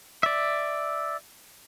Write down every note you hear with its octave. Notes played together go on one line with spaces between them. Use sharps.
D5 E5